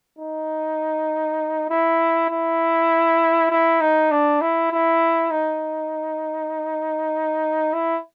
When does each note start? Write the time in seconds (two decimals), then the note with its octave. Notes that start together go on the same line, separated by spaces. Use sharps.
0.19 D#4
1.70 E4
2.30 E4
3.51 E4
3.81 D#4
4.11 D4
4.42 E4
4.72 E4
5.31 D#4
7.74 E4